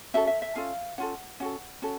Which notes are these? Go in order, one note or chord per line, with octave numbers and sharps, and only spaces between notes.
C#4 F#4 A4 E5
E5
E5
C#4 F4 A4 F5
C#4 F4 A4 F#5
C#4 F#4 A4 F#5
C#4 F#4 A4